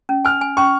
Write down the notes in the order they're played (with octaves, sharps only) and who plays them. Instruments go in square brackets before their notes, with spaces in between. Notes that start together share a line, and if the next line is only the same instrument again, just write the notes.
[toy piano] C#4
[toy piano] G#5 [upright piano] F6
[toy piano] G#5
[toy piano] C#4 [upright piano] C#6